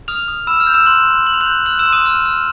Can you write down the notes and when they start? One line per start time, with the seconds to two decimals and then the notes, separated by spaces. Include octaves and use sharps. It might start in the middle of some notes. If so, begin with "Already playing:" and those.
0.08 D#6 F6 F7
0.28 D#6
0.47 B5 E6 E7
0.60 F6 F7
0.67 G6
0.74 E6 E7
0.86 C6 F#6 F#7
1.07 C6
1.27 C6 F#7
1.34 F7
1.41 F#6 F#7
1.46 G6
1.66 F6 F#6 F#7
1.79 E6 E7
1.86 C6
1.92 D#6 D#7
2.06 F6
2.25 F6